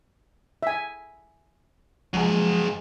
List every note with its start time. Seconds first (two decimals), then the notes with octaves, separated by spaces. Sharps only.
0.63 E5 G#5
2.13 F#2 F3 G#3 G#4